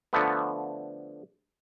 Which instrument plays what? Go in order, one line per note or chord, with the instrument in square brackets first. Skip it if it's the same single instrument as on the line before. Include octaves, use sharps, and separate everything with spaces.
[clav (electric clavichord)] D3 F3 A3 B3